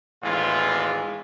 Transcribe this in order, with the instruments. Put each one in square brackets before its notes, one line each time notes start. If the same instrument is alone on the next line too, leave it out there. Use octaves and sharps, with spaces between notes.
[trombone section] G#1 E2 A2 E3 G#3 F4